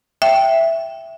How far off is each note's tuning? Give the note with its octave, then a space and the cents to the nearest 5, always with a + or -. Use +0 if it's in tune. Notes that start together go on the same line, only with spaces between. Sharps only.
E5 +5 G5 +0